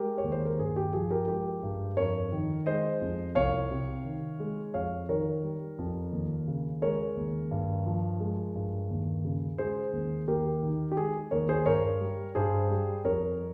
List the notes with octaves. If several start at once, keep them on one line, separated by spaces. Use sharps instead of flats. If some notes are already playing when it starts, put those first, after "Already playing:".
Already playing: G#3 G4 A#4
C#5
D#2
C5
A#4
G2 G#4
G4
F3 G#4
G4 A#4
G#3 G4 A#4
G2
F2 A#4 C#5
D#3
G#3 C5 D#5
F2
C2 C#5 F5
C3
D#3
G#3
F2 C#5 F5
D#3 A#4 C#5
G3
F2
D#2
C#3
G#3 A#4 C#5
D#2
G2
F3
G#3
G2
D#2
C#3
G#3 G#4 C5
D#2
D#2 G4 A#4
D#3
G4
G#3 G#4
D#2 A#4 C#5
G#4 C5
G2 A#4 C#5
G3
G2 G#4 C5
G3
F2 A#4 C#5